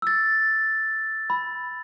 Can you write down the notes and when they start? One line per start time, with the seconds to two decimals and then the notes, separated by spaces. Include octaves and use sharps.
0.02 E6 A6
1.30 B5